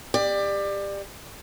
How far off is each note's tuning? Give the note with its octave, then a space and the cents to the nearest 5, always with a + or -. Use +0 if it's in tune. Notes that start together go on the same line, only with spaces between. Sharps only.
G4 +25 D5 +25